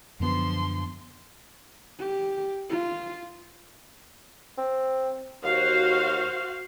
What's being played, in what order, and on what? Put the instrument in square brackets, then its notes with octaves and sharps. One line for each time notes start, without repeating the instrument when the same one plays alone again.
[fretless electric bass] F#2 D3 B3 [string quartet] F3 C6
[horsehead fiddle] G4
F4
[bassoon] C4
[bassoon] D#2 [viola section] F#4 C5 F5